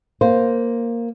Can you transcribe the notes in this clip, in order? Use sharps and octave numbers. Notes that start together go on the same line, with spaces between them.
A#3 C5